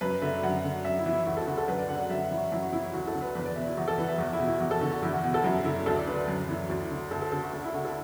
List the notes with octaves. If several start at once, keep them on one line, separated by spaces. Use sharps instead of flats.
F#2 B4
D3 E5
F#2 F#5
D3
F#2 E5
E4
E3
E4
D2 F#4
A4
D3 F#4
A4
F#2 B4
D5
D3 F#5
F#5
F#2 E5
F#5
E3
F#4
F#2 E4
F#4
E3 E4
E4
D2 F#4
A4
D3
B4
E2 B4
D5
B2 E5
E4
E2 F#4
A4
E3 B4
F#5
E5
E2 F#4
E4
B2
E4
E2 F#4
A4
D3 F#4
F#4
E2 E4
F#4
B2 F#4
A4
F#2 E4
D3 E4
D2 A4
D5
D3 B4
F#2
E3
D2
D3
D2 A4
A4
D3 A4
F#4
D2 F#4
E4
D3 F#4
A4